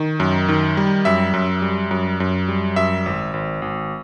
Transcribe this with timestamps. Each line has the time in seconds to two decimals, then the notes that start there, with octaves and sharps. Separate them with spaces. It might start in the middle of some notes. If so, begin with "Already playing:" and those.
Already playing: D#3
0.20 F#2
0.49 D#3
0.77 G3
1.05 F#2 E5
1.34 F#2
1.62 G3
1.91 F#2
2.20 F#2
2.48 G3
2.76 F#2 E5
3.06 G#1
3.34 G#1
3.62 G#1